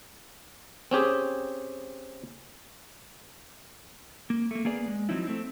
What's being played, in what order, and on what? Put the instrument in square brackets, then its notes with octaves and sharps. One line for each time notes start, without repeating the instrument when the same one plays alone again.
[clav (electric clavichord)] C4 C#4 G4 G#4
[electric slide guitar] A#3
A3 A#3
A#3 B3 G#4 D5
G#3
F3 F#3 C4 D#4 E4
A3 C4